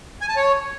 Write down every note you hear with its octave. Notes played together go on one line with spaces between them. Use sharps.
G#5
A5
C#5